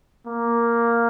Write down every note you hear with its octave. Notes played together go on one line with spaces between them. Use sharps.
A#3